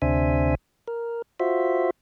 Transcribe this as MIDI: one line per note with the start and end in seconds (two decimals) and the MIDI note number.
0.02 0.55 38
0.02 0.55 48
0.02 0.55 62
0.02 0.55 72
0.02 0.55 76
0.02 0.55 80
0.88 1.22 70
1.40 1.90 65
1.40 1.90 66
1.40 1.90 72
1.40 1.90 76